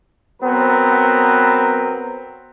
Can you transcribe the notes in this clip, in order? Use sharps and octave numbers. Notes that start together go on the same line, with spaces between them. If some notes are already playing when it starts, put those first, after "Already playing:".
F#3 B3 C4 A#4